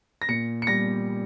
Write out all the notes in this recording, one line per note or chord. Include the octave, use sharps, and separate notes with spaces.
A#6
A#2 C#7
C#7
G3 A#6